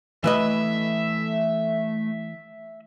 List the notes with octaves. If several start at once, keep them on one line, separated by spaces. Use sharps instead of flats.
E3 A3 B4 D#5 E5